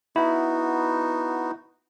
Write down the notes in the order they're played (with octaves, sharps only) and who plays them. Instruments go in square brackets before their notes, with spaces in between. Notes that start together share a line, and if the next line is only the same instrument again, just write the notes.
[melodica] B3 D#4 F#4 [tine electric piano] E4